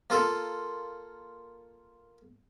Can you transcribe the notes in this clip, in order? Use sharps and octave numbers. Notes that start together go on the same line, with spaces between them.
A#3 F4 A4